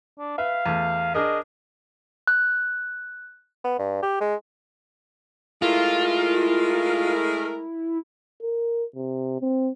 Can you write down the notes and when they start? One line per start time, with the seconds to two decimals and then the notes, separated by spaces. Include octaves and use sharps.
0.18 D4
0.38 B4 E5 F5
0.66 E2 A3
1.15 D4 G#4 A#4 D#5
2.27 F#6
3.64 B3
3.79 G2
4.02 G4
4.21 G#3
5.62 G#3 A3 E4 F4 A#4
8.42 A#4
8.95 C3
9.41 C4